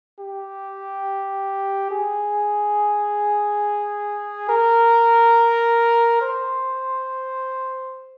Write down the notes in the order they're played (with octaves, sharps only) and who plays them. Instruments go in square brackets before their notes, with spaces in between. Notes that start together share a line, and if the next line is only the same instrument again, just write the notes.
[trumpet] G4
G#4
A#4
C5